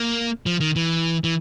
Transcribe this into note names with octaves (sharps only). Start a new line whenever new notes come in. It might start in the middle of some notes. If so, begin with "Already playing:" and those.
Already playing: A#3
F3
D#3
E3
E3